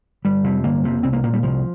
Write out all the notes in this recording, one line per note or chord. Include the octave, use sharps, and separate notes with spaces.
G1 G3
F2 C3
G1 A#3
F2 C3
C2 C4
A#3
A#2 A#3
G3
C2 F3